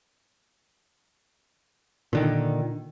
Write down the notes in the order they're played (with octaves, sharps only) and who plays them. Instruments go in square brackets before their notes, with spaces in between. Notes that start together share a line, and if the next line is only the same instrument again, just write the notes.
[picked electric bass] A#2 D3 D#3